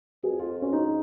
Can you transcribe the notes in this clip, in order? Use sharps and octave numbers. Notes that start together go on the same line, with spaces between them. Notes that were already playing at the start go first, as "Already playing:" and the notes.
F2 G#4
F4
C#4
G#2 D#4